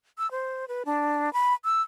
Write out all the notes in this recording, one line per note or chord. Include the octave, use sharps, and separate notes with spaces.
E6
C5
B4
D4
B5
E6